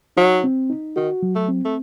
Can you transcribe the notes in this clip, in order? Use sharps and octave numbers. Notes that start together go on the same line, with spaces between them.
F#3 D#4
C4
D#4
D#3 F#4
F#3
A3
C4
A3